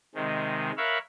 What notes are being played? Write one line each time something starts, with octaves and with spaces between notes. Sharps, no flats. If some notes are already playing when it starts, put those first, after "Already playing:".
C3 D#3 G#3
A#4 C#5 E5 F5 B5 F#6